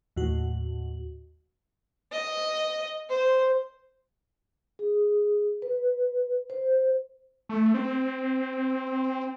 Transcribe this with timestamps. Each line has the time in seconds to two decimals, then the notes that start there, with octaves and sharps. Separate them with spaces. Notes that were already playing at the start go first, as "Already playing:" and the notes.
0.17 D#2 A2 F#4
2.12 D#5
3.09 C5
4.79 G#4
5.62 B4
6.50 C5
7.49 A3
7.74 C4